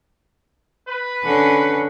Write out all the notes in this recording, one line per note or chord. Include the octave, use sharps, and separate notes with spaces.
B4
D3 C#4